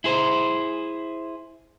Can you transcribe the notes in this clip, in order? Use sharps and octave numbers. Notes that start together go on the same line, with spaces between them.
E4 G#4 C5